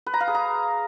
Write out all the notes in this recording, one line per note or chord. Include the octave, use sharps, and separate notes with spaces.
B4
A#5
F5
G#4
A#5